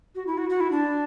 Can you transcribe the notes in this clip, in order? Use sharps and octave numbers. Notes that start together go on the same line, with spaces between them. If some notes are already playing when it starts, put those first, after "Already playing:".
F#4
E4
F#4
F#4
E4
D4